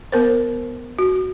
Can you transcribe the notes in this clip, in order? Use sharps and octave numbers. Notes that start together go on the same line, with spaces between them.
B3 A#4 C5
F#4